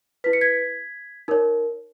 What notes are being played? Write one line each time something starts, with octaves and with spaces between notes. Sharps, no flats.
E4 B4 B6
C#7
G#6 B6
D#4 A#4 C#5